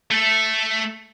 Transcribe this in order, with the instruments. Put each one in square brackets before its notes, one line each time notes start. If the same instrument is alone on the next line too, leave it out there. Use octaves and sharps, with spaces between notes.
[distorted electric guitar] A3 A4